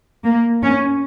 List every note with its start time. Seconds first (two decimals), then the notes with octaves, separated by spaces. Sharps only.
0.25 A#3
0.62 C#4